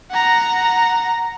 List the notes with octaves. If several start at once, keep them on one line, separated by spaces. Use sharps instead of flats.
F#5 A#5